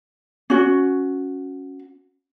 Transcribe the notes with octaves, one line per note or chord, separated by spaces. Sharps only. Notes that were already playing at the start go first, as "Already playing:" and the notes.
C#4 F#4